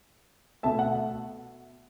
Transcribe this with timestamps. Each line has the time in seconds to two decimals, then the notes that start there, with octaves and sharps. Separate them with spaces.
0.63 B2 A3 E5 A5
0.79 F#5